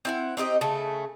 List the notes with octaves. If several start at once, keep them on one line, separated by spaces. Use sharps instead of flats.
C4 E4 F#5
C4 D#4 G4 D#5
C#3 A3 A4